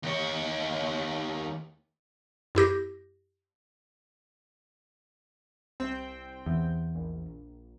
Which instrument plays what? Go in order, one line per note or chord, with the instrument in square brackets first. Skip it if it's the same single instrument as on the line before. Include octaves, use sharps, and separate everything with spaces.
[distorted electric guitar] D#2 C#5
[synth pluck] F#2 E4 G4 A#6
[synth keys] C2 C4 G5
[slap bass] E2
[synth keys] A#1